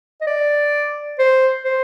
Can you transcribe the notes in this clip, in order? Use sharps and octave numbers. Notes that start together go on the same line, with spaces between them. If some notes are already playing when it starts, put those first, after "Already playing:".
D#5
D5
C5
C5